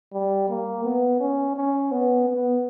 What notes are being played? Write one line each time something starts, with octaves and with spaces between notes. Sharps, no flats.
G3
A#3
B3
C#4
C#4
B3
B3